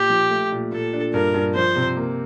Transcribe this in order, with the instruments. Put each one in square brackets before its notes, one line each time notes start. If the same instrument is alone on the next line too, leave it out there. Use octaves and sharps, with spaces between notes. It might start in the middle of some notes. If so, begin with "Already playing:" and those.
Already playing: [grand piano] A#2 F4 [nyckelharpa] G4
[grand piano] F3
A3
A#2
[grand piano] A#2 [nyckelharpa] A4
[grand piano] D4
[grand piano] G2 [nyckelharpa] A#4
[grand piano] G2
[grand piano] F3 [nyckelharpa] C5
[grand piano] C3
A#3